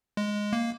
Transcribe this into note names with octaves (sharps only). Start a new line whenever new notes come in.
G#3
A#3